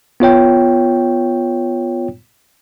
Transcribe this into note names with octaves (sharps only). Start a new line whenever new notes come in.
B3 F4 C#5 G5